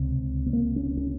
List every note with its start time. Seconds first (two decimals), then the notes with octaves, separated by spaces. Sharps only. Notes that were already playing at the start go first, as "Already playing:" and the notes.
Already playing: C#2 C3
0.46 B3
0.53 A#3
0.76 C#4
0.97 C#4